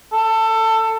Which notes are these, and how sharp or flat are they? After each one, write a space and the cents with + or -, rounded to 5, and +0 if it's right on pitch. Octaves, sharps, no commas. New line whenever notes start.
A4 +20